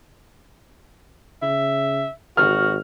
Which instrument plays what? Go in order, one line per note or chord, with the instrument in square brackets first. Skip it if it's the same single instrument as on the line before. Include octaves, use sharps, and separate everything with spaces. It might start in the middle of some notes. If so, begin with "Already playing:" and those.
[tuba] C#3 [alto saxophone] E5
[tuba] G#1 [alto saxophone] F#4 [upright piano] F6